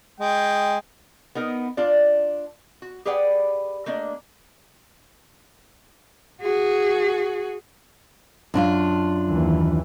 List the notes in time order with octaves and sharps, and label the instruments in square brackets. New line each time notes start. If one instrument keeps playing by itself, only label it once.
[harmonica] G#3 G5
[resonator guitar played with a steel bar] B3 D#4 A#4
D4 F4 D5
F#4
G4 G#4 B4 D5 F#5 G5
A3 A#3 D4 D#5
[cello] F#4 G#4
[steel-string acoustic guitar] F#2 D4 F4
[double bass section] D#2 E3